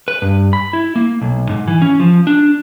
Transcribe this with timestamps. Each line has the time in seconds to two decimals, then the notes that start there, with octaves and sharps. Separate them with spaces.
0.08 B4
0.22 G2
0.53 B5
0.73 E4
0.96 A#3
1.21 B1
1.49 G#2
1.67 E3
1.82 C#4
2.00 F3
2.27 D4